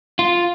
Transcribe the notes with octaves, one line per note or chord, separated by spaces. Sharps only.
F4